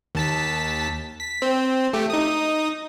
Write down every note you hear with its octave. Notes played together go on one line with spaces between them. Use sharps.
D#2 A5 B6
B6
C4
A3 G4
D#4 D#6